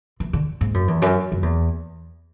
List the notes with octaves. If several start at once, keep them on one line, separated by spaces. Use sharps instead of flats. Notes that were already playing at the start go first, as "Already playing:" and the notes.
E3
D3
G#2
F#2
E2
F#2
F#2
E2